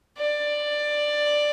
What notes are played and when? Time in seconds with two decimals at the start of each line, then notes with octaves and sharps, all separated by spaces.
0.17 D5